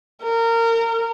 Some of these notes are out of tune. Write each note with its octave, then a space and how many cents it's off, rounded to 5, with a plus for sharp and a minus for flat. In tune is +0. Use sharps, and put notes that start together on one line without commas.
A#4 -25